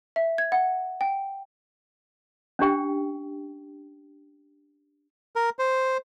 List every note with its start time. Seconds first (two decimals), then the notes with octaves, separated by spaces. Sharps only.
0.16 E5
0.38 G#6
0.52 F#5
1.01 G5
2.59 C#4 D4 G4 G5
5.36 A#4
5.59 C5